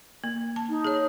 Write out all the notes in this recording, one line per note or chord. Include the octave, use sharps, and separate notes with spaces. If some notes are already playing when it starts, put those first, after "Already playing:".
A#3
A5
D#4
G#4 C#5